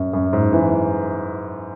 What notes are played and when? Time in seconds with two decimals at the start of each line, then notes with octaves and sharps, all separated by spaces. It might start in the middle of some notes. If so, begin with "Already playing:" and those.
Already playing: F#2
0.13 F#2
0.33 G#2
0.53 E3